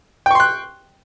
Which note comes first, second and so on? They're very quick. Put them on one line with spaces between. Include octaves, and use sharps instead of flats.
G5 C#6 C6 F#6